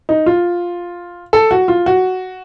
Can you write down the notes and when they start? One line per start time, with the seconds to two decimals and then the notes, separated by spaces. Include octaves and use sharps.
0.09 D#4
0.26 F4
1.33 A4
1.51 F#4
1.68 F4
1.86 F#4